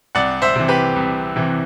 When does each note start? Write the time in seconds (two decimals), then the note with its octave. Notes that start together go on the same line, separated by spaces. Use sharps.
0.15 C2 D5 F#5
0.42 C5 E5
0.55 C3 E3
0.68 G4 B4
0.96 C2
1.36 C3 E3